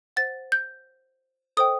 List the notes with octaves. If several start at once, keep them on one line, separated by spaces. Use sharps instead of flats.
C5 F#5 A6
G6
A4 C5 D#5 G5 D#6